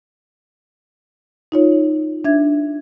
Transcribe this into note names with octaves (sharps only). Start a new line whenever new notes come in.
D#4 F4 C#5
D4 E5 G#6